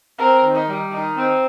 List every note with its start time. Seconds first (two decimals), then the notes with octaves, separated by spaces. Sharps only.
0.19 C4 A#4
0.43 D#3
0.55 D#4
0.68 G3
0.92 D#3 D#4
1.16 C4